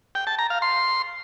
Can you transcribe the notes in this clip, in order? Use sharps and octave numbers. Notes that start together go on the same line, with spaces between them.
G5
A5
A#5
F5
C6